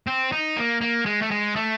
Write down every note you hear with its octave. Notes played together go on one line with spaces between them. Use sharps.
C4
D#4
A#3
A#3
G#3
A3
G#3
A3